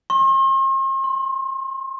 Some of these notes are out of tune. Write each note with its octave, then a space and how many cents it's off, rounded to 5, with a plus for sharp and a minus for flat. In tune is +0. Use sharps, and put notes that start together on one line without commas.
C6 +45
C6 -5